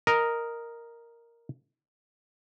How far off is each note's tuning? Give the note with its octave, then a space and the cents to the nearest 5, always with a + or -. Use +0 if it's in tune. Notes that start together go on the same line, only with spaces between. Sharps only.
A#4 +0 D#5 +0